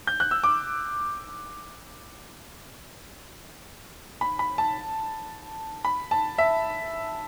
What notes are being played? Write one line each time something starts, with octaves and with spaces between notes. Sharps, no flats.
G6
F#6
E6
D6
B5
B5
A5
B5
A5
E5